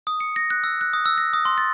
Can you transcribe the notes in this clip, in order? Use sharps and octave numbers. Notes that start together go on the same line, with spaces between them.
D#6
C#7
A#6
F#6
E6
F#6
D#6
E6
A#6
D#6
C6
A6